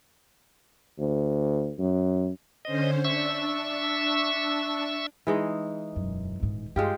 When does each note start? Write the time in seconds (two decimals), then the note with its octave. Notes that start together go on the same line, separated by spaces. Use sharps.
0.98 D2
1.79 F#2
2.65 D3 C#4 C5 D#5
3.04 D4 E5 C#6 E6
5.27 E3 G#3 D#4
5.96 E1 F#2
6.40 D#1 G#2
6.76 G2 G#3 F4 G4